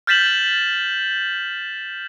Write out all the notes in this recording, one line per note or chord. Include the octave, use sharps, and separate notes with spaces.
F6 G6 A6 B6 E7 F#7